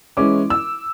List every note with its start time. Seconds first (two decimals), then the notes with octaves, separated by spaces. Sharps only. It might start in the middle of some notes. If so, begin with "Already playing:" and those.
0.17 E3 G#3 C#4 E4 D6
0.50 E6